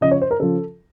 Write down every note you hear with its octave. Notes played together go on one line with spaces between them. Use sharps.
C#3 F3 D#5
C#5
C5
A#4
C#3 F3 A4